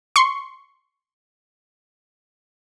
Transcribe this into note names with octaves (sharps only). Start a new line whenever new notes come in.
C6 C#6